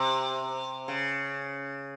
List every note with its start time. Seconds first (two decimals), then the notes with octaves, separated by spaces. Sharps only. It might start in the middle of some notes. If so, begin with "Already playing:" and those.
Already playing: C3
0.88 C#3